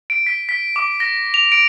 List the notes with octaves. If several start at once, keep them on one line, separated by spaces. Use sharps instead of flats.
D7
B6
B6
D6
A#6
F7
D7